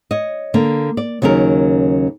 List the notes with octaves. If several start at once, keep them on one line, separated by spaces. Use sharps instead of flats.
C#5 D#5
D3 A#3
D5
D#2 C#3 F#3 C#4 A#4